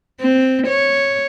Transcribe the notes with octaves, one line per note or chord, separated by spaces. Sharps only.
C4
C#5